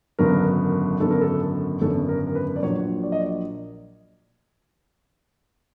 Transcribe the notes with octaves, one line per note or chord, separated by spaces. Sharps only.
G#1 F#2 D3 F#3 B3 A#4
G#1 F#2 D3 F#3 B3 A4
A#4
A4
G#1 F#2 D3 F#3 B3 A4
A#4
A#4
B4
D5
A#1 A#2 F#3 C#5
D5
D#5
D5